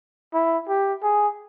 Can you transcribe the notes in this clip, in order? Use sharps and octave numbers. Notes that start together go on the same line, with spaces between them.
E4
G4
G#4